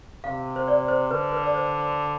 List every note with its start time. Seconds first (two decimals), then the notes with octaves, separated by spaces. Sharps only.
0.24 C3 F5
0.56 C5
0.68 D5
0.88 C5
1.11 D3 B4
1.32 B4
1.44 D5
1.54 C5